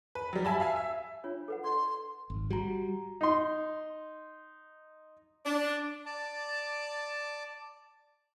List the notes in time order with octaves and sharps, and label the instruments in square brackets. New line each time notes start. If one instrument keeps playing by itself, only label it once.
[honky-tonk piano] B4
F#3 G3
E5 G#5 A5 B5
E5 F5 G#5
E5
[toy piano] D4 F4 C#5
A4 B4 F#5
[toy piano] D5 D#5 [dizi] C6
[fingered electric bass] G#1
[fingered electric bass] G3 [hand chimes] F#4 A#5
[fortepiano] D#4 C6
[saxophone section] D4
[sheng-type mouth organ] D5 A5 D6